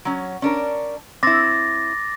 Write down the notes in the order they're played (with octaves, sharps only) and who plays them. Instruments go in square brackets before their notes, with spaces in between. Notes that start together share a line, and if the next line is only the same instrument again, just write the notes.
[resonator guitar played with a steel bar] F#3 C#4
C#4 D4 A#4
[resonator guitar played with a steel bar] C4 E4 [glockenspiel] D6 A6 A#6